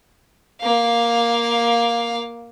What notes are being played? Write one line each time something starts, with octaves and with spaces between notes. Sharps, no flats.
A#3 F5